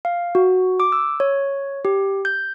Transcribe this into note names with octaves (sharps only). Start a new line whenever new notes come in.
F5
F#4
D6
E6
C#5
G4
G6